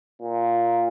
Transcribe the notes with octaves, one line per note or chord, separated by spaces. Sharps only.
A#2